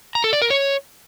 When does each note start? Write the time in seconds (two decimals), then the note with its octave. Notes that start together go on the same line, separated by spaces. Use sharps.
0.15 A#5
0.24 A4
0.33 D5
0.42 A#4
0.50 C#5